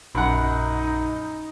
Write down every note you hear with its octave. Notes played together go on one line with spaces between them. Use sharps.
A#1 F#2 D#4 F#5 G#5 A#5 B5